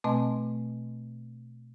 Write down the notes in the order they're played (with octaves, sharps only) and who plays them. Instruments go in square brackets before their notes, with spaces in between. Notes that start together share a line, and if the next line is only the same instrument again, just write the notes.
[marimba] B2 A3 C4 D#5 G#5